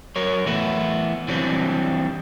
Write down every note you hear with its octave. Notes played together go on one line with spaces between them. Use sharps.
F#3 A#4 C#5
E3 A3 B3 E4
E3 F#3 G3 C4 D4